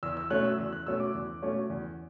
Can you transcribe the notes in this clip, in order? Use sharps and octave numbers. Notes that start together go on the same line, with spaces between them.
E2 E6
E6
B2 A3 C#4 F#6
E6
E2 E6
F#6
B2 A3 C#4 E6
D6
E2
B2 A3 C#4
E2